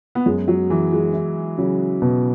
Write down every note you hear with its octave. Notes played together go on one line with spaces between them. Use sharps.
B3
F#2 G#3
F#3
E3 G#4
G#3
E4
C#3 F#3
B2